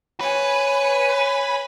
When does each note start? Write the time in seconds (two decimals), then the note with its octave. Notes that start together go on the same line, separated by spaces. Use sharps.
0.20 B4 C#5 G#5